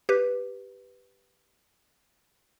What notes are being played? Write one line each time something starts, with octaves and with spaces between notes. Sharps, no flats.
G4 B4